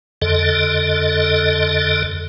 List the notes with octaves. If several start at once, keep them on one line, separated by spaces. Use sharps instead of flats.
F2 D3 A4 D#5